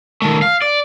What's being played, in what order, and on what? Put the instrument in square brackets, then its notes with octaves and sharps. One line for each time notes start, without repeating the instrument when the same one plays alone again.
[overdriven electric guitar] D#3 A3
F5
D5